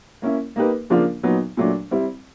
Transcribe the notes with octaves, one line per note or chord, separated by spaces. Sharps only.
A#3 C#4 E4
A#3 D#4 G4 B4
C#3 F3 A#3 D4 F4
A#2 F#3 B3 D#4
A#2 F#3 A3 D4
G3 C4 E4